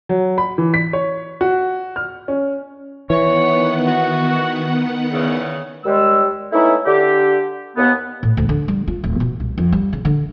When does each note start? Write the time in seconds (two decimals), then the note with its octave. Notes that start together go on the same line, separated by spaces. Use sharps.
0.09 F#3
0.38 B5
0.58 E3
0.74 B6
0.93 C#5
1.41 F#4
1.96 F6
2.28 C#4
3.10 D#3 E3 B3 C#5 F#5
3.86 F#4
5.13 E2 C#3
5.84 D#2 G3 G#3 E6
6.53 A3 B3 C#4 D#4 E4
6.86 D3 G4
7.77 D#2 B3
8.23 A2
8.37 D2
8.49 D3
8.68 G3
8.88 F4
9.04 D1
9.20 B2
9.40 C2
9.58 F2
9.72 G3
9.93 C#3
10.05 D3